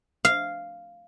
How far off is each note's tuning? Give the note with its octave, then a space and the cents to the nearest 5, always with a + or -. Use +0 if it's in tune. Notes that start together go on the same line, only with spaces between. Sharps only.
F5 -5